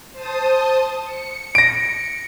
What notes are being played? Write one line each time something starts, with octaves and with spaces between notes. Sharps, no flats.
C5 A5 D#6
C#7
A#6 D7